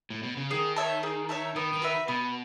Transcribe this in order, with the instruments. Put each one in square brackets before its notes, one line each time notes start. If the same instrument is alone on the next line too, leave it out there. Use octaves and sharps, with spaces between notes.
[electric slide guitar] A2
B2
C#3
[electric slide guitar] D#3 [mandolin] G#4
[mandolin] C#5 E5 A5
G#4
C#5 E5 A5
[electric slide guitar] D#3 [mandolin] B3
[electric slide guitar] D#3
[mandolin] F#4 B4 E5
[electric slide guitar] B2 [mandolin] B3